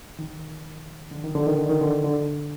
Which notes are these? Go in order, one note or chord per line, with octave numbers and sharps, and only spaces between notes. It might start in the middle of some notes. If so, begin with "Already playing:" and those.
D#3
D3
D#3
D3
D#3
D3
D#3
D3
D3